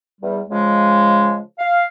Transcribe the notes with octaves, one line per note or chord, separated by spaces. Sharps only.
E2 G3
C#3 F3 G#3
F5